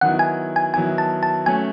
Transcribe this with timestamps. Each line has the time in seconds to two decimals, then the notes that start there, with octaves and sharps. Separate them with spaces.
0.01 D#3 F#3 B3 E4 F#5
0.19 G#5
0.56 G#5
0.74 D#3 F#3 B3 E4 G#5
0.98 A5
1.23 A5
1.46 F#3 A3 C#4 G#5